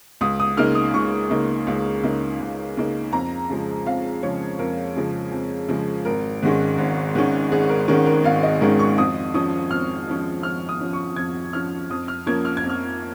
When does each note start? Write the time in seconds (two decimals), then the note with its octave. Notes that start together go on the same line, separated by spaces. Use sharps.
0.21 C#2 D#6
0.40 D#6
0.57 C#3 A#3 D#4 F6
0.75 D#6
0.94 C#2 C#6
1.31 C#3 A#3 D#4
1.67 C#2
2.03 C#3 A#3 D#4
2.40 C#2
2.77 C#3 A#3 D#4
3.13 F2 A#5
3.50 C#3 F3 G#3
3.86 F2 F5
4.23 C#3 F3 G#3 C#5
4.59 F2 A#4
4.96 C#3 F3 G#3
5.32 F2
5.69 C#3 F3 G#3
6.05 G#1 A#4
6.42 G#2 D#3 G#3 C#4
6.78 G#1
7.15 G#2 D#3 G#3 C#4
7.52 G#1 G#4
7.69 A#4
7.88 G#2 D#3 G#3 C#4 A#4
8.06 A#4
8.24 G#1 F5
8.43 D#5
8.61 G#2 D#3 G#3 C#4 A#4
8.79 C#6
8.97 F2 D#6
9.34 F3 C#4 D#6
9.70 F2 F6
10.08 F3 C#4
10.43 F2 F6
10.69 D#6
10.80 F3 C#4
10.93 C#6
11.16 F2 G#6
11.53 F3 C#4 F6
11.90 F2 D#6
12.08 F6
12.26 F3 A#3 C#4 G#6
12.45 F6
12.57 G#6
12.63 F2
12.70 F6